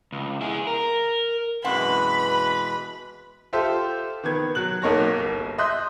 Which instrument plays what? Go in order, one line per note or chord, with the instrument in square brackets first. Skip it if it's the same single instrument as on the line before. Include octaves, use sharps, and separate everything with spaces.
[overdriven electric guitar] C#2
E4 G#4
A#4
[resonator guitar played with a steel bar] F#2 C4 F#5 [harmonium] B2 E3 G#3 [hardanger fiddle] B4 [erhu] B5
[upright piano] F4 G4 A4 C5 E5
D#3 B3 G#6
F#3 F#6 F#7
B1 A#3 D#4 C#5 A5 A#6
G1
D#5 E5 C6 D#6 F#6 G6